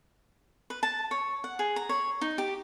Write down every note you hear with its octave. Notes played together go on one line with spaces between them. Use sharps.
B4
A5
C#5
F#5
G#4
A#5
C#5
D#4
G4